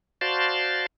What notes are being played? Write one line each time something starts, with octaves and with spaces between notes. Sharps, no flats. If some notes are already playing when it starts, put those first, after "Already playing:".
F#4 C5 D5 F5 A5 C6